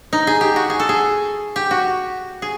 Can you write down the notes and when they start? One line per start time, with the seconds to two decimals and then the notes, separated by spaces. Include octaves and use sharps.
0.13 D#4
0.27 G#4
0.41 G4
0.56 F#4
0.70 G#4
0.80 A4
0.89 G#4
1.56 G4
1.71 F#4
2.42 G#4